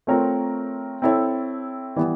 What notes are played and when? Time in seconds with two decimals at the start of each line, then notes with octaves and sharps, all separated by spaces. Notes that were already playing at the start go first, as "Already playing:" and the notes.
0.07 A3 C4 F4 A#4 C#5
1.02 C4 E4 A4 C#5
1.96 E3 G3 B3